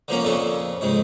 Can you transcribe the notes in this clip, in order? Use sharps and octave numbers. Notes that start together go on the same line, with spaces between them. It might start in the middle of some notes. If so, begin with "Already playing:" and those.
D3 F3 A#3 C#4
F2 A#2 C#3 A4 C#6
F2 G#2 C#3